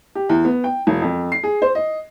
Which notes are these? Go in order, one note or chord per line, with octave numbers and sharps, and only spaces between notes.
G4
E2
B3
G5
E1
F2
C7
G#4
C5
D#5